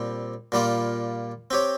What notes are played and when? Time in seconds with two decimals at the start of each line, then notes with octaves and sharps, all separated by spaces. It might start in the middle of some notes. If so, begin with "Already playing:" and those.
Already playing: A#2 G3 C4
0.52 A#2 G3 A#3 F4
1.51 C4 G4 C#5